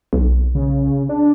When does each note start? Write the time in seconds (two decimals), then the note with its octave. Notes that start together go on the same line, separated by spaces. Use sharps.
0.13 B1
0.55 C#3
1.09 D4